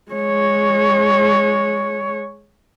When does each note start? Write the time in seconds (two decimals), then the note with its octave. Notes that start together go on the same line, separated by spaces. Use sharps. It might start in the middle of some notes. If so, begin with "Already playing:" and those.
0.11 G#3 C#5